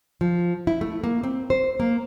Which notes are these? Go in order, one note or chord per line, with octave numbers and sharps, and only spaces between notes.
F3
E4
A3
A#3
C4
C5
A#3